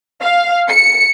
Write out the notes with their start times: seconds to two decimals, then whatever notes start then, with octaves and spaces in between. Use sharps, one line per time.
0.23 F5
0.68 C#7